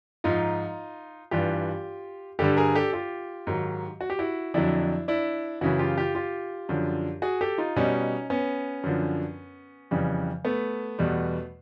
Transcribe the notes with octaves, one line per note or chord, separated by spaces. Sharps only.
G#2 F3 D#4 F4
G2 E3 G3 F4 G4
G2 D3 G3 G4 A4
G#4 A#4
G4 A4
F4 G4
G#2 D#3 F#3
F#4
G4
E4 F#4
F2 D3 F#3 D4 E4
D4 E4
F#2 C#3 E3 E4 F#4
F4 G4
F4 G4
F4 G4
F#2 D3 F3
F#4 G#4
G4 A4
D#4 F4
B2 G3 C#4 D#4
B3 C#4
F#2 D3 F3
F2 C#3 E3 G3
A3 B3
E2 B2 G3